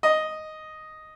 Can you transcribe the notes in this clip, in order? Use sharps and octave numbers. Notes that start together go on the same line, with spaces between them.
D#5